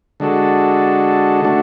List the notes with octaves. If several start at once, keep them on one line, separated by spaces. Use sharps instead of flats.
D3 G#3 D4 F#4 A4
D3 A3 D4 F#4